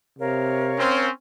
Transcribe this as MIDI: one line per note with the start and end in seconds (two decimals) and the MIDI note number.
0.19 0.83 48
0.19 1.08 70
0.19 1.08 73
0.19 1.08 77
0.78 1.10 60
0.78 1.10 61